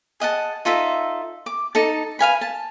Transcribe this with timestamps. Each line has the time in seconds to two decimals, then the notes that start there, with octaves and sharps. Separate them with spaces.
0.20 G#4 D#5 F#5 A5
0.65 D#4 F4 A4 E5
1.46 D6
1.75 D#4 A4 A5
2.19 B4 F5 G#5 B5
2.41 A5